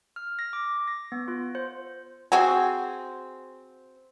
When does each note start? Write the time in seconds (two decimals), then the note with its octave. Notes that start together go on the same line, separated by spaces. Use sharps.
0.16 F6
0.39 A#6
0.53 D6
0.88 A#6
1.12 B3
1.28 F4
1.55 C5
2.32 C4 F#4 G#4 G#5